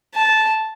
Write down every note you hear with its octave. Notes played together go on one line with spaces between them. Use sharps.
A5